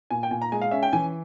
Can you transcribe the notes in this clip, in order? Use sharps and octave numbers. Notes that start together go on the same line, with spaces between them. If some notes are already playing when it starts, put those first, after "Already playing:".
A#2 G#5
G5
A#2 G#5
A#5
G#3 G#5
F5
C#4 E5
G5
E3 G#5